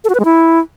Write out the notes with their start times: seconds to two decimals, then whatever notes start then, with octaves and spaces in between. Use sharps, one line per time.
0.04 A4
0.09 F#4
0.15 B4
0.20 G#3
0.25 E4